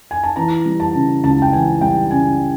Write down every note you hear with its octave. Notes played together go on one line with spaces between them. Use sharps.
G#5
A5
E3 A#5
G3
A5
C#3
C#2 A5
G5
E3 G#5
G3 G5
C#3 G#5